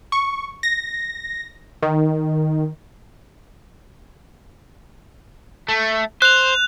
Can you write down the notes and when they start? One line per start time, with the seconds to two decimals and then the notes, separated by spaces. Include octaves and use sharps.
0.12 C#6
0.63 A#6
1.82 D#3
5.69 A3
6.22 C5 F#6 F7